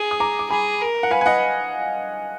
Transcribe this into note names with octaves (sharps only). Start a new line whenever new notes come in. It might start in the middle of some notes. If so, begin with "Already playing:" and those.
Already playing: G#4
D#6
A#5 D6
D6
G#4 G#5 B5
A#4
F#5
B4 F5 G#5
G#5
D#5 F#5